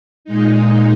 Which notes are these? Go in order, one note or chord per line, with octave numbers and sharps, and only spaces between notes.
A#2 G#3 D#4